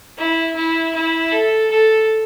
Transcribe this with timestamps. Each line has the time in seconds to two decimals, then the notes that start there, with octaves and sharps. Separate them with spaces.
0.17 E4
0.56 E4
0.94 E4
1.32 A4
1.70 A4